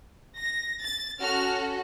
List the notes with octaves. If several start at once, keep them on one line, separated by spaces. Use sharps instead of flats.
A#6
A6
C#4 F#4 A4 F6